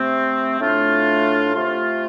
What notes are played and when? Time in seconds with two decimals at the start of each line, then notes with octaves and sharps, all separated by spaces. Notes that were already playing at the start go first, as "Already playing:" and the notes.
Already playing: C3 A3 C4
0.59 A2 A3 D4 F4
1.54 C3 A3 F4